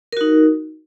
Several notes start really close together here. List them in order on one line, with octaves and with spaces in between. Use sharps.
A#4 F#4 D#4